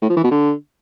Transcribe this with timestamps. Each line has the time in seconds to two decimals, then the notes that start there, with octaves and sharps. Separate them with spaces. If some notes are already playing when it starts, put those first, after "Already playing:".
0.02 A2
0.09 F3
0.17 E3
0.24 B2
0.31 D3